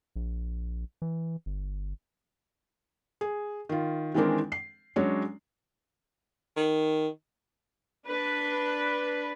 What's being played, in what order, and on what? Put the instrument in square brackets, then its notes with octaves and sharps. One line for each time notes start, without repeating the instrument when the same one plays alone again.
[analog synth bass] A#1
E3
G1
[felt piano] G#4
D#3 F4
D#3 E3 G#3 C4 D4 A#4
C7
F#3 G#3 C#4 D4 C#5
[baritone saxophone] D#3
[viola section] D4 B4